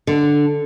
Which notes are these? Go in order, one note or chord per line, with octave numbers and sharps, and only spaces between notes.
D3